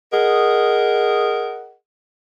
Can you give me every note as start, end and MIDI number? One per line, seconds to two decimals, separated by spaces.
0.12 1.73 68
0.12 1.73 70
0.12 1.73 75
0.12 1.73 78